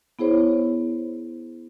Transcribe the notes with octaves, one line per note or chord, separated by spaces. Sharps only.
B3 E4 G#4 C5 C#5